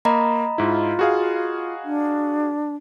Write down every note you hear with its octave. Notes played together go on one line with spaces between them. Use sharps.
A#3 D#5 A#5 B5
G#2 E4 F4
F#4 G#4 F5
D4